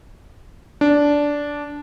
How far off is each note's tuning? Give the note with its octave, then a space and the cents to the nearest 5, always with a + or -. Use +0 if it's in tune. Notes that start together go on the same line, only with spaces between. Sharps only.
D4 -10